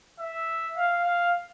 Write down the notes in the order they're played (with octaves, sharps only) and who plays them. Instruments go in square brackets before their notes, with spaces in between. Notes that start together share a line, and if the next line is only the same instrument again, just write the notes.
[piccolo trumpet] E5
F5
F5